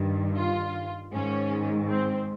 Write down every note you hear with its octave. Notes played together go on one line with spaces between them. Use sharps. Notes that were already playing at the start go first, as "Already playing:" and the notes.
Already playing: G2 D#3
F4
G#2 D#3 C#4
C4